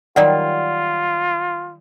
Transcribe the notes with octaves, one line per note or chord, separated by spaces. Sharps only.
D#3 F#3 G3 F4 D5 F#5